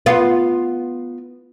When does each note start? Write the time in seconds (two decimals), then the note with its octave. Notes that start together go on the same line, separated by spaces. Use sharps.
0.06 B3 F4